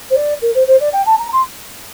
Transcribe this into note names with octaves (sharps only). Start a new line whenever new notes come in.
C5
D5
A#4
C5
C5
D5
G5
A5
A#5
C6